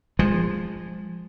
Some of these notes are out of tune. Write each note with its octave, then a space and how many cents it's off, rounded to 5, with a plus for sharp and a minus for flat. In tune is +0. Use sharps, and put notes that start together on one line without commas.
F3 +0 G#3 -25